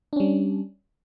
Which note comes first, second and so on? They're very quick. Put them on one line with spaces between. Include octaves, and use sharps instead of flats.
D4 C#4 G3